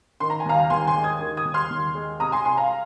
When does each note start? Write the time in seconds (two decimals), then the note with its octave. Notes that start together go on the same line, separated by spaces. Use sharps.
0.20 D#3 C6
0.30 A#5
0.40 G#5
0.45 D#2 F5 A#5
0.70 D#2 G#5 C6
0.87 G#5 C6
0.96 G#3
1.04 D#6 G#6
1.21 D#3
1.37 D#6 G#6
1.45 D#2
1.54 C6 F6
1.70 D#2
1.95 G#3
2.20 C3 A#5 D#6
2.32 G#5 C6
2.45 C2 G#5 C6
2.57 F5 A#5